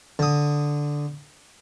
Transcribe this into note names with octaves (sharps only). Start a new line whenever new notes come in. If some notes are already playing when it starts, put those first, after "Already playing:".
D3 D#6